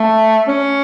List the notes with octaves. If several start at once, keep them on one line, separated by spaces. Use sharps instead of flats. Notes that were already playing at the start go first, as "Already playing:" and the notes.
Already playing: A3
C#4